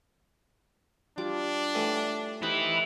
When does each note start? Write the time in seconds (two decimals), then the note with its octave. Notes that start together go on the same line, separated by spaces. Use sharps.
1.18 G3 D4 F4 D6
1.75 A2 E3
2.43 D#4 E4 G4 B4 C5